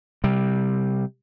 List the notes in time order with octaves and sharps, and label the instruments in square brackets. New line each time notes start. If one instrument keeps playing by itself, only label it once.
[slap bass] C3 G3